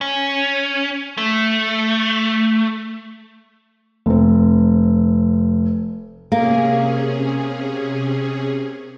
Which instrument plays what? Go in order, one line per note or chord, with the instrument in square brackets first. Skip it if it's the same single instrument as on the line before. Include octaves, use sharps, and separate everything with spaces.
[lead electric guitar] C#4
A3
[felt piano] F1 C4
[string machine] C3 C#4 G#4 [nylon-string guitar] A#3